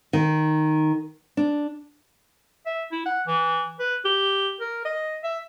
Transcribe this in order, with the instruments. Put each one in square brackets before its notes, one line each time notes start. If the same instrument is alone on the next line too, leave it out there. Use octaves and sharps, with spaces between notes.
[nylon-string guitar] D#3
D4
[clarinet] E5
E4
F#5
E3
B4
G4
A#4
D#5
E5